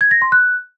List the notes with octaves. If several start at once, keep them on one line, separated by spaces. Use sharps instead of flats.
G#6
A#6
C6
F#6